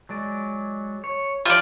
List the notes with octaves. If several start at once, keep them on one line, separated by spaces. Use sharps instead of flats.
F#3 G#3 D5
C#5
F3 D4 F4 G4 D5